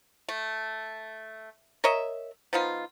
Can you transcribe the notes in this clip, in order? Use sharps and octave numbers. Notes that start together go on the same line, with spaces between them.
A3
A#4 C#5 D#5 E5
F3 B3 D#4 F4